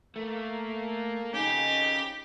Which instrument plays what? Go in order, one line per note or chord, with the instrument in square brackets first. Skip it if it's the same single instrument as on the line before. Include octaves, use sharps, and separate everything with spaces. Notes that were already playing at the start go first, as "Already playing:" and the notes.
[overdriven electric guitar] A3 [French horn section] A#3
[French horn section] F2 D#3 D#4 [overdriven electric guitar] C#4 G#4 [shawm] G4